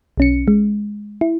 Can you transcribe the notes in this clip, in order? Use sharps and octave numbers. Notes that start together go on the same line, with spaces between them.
B1 C#4 C#7
G#3
E4